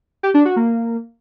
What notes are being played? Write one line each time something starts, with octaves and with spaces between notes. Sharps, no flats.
G4
D4
F#4
A#3